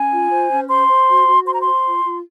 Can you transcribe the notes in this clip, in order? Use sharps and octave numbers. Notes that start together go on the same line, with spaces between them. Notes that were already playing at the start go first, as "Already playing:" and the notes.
Already playing: C#4 G#5
F4
C5
C#4
C5 C6
C5
F#4
F#4
C5 C6
A#5
C5 C6
F4
F4